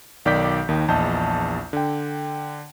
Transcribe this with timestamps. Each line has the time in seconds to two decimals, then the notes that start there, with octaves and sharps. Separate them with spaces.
0.25 B1 D#3 D5 D6 G6 B6
0.69 D#2 D#3 D#4
0.88 A#1 E2 D#5 A5 G6
1.73 D3 G5